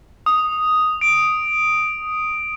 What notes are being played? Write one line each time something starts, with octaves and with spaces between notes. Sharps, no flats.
D#6
D7